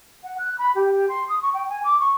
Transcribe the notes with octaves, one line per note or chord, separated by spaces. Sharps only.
F#5
F#6
B5
G4
C6
D#6
C#6
G5
G#5
D6
C#6